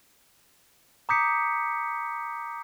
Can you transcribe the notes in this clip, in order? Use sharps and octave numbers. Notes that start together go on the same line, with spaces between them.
A#5 D6 D#6 G6 B6 C#7